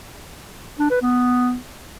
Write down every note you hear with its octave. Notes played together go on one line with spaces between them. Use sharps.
D4
B4
B3